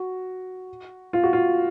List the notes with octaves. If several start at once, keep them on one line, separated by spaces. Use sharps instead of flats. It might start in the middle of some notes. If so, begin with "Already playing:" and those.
Already playing: F#4
F4
F#4
F4